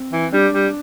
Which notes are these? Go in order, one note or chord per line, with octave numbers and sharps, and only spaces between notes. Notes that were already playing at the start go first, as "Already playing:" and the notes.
Already playing: C4
E3
G3 D4
G3